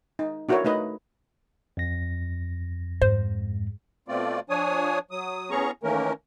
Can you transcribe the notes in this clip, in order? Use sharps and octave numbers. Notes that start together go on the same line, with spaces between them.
D#4
D4 E4 F#4 A4 A#4 C#5
A3 D#4 B4 D#5
F2 A#6
G#2 C5
B2 A3 C4 F4 D5
F3 D4 C#5 G#5 D#6
F#3 D#6
A2 B3 C#4 G#4 A#5 C#6
D#3 E3 A3 A#3 C#4 A#4